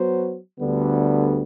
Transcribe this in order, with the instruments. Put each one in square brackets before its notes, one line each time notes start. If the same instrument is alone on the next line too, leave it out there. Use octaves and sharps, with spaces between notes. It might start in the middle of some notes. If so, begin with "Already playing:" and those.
Already playing: [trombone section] F#3 B3 F#4 C5
D2 D3 G3 B3